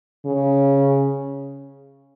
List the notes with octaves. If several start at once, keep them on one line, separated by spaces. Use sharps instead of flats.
C#3